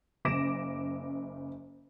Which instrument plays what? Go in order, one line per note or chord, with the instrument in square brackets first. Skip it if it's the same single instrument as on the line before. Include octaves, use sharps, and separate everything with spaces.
[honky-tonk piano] F#1 C#3 D6 A#6 D7 E7